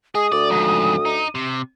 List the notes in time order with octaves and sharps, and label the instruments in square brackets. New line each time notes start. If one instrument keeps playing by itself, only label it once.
[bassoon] G#3 [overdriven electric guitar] G#4 [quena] D#6
[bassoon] D2 [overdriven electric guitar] D5
[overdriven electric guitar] F2 G#2
D#4
C3